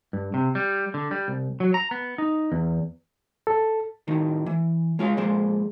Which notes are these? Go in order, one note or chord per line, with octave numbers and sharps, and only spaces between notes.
G2
C3
G3
D3
G3
C2
F#3
A#5
B3
D#4
E2
A4
A2 D#3 D#4
E3
G#3 F4 C#5 F5
A#2 F3 G#3 C5